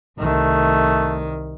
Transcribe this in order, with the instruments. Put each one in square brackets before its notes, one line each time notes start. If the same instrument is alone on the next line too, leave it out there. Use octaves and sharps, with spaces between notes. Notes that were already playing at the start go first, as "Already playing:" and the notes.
[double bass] C2 D#3 [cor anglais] A3